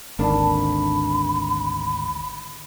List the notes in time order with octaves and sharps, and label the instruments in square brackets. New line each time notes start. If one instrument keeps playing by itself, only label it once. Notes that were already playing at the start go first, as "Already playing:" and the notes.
[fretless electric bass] G#1 [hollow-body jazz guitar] D2 D#3 A#3 [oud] D4 [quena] B5